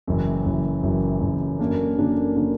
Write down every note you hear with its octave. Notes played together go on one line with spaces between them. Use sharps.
F#1 F#2 E3
F#1 F#2 E3
F#1 F#2 E3
F#1 F#2 E3
F#2 D3 A#3 D4
F#2 D3 A#3 D4
D3 A#3 D4